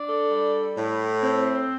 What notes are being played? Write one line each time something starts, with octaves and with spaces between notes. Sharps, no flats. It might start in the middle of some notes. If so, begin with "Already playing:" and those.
Already playing: D4
A4
G3
A2
C4